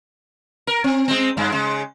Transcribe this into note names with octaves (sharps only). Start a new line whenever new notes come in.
A#4
C4
G#3 C4
G2 G#3
C#3 G#3